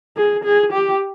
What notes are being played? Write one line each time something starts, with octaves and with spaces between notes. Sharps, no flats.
G#4
G#4
G4